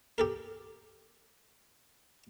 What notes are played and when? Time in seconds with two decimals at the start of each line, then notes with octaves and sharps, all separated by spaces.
0.18 G4 A4 A#4